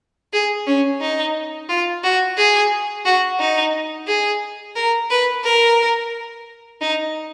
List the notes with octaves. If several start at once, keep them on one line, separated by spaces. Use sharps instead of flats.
G#4
C#4
D#4
F4
F#4
G#4
F#4
D#4
G#4
A#4
B4
A#4
D#4